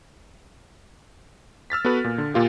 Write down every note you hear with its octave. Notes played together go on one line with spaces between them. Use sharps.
E6 F6 A6 B6
B3 F#4 A4 B4
A#2
D3
A#2 F4 G4